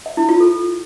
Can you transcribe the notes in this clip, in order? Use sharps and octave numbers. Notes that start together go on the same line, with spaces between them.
E5
E4
F4
A4